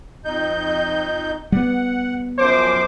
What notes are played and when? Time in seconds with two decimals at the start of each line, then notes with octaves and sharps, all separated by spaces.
0.25 F2 D#4 G6
1.52 G3 B3 F#5
2.38 F#2 F3 C5 D6